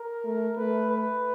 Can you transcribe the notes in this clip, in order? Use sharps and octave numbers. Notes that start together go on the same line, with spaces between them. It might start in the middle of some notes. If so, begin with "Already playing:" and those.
Already playing: A#4
A3
A3 B4
B4